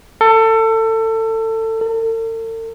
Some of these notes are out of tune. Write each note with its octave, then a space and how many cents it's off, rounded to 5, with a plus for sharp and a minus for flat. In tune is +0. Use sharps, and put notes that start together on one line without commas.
A4 +25
A4 +45